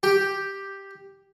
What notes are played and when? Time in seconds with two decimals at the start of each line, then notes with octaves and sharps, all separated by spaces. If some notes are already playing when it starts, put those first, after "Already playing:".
0.03 G4